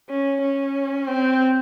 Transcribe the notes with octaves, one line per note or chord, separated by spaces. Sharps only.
C#4
C#4
C4